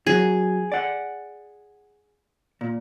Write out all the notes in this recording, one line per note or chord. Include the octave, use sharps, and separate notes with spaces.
F#2 F#3 G#4
D5 F#5
A#2